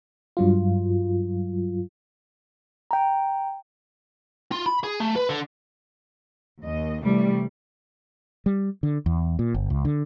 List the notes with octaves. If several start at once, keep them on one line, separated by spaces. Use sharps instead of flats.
G2 F#3 F4
G5 A#5
F4
B5
G#4
A3
B4
D3
D#2 D#5
C3 E3 G3 A3
G3
D3
E2
A#2
G1
C#2
D3